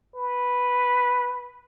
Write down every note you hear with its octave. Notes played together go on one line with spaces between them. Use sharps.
B4